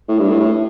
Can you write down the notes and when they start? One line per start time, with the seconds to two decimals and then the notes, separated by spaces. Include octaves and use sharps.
0.09 A2
0.19 G2
0.29 A2
0.40 A2